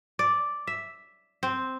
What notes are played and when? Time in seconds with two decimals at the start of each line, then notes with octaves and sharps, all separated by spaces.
0.19 D5
0.67 E5
1.43 C4